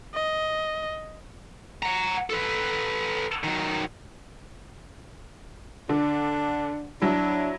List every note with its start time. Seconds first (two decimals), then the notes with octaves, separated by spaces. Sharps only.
0.14 D#5
1.83 F#5 A#5
2.30 A4 B4
3.44 D#3 F#3
5.89 D3 D4
7.02 F#3 D4 E4